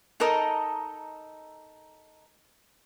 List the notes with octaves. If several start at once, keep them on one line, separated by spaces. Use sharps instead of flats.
D#4 A4 A#4 D#5